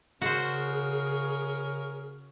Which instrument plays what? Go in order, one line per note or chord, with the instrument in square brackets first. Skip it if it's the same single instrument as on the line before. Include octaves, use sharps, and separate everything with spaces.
[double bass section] C#3 [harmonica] C#4 A#4 [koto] F#4 C5 [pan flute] G#4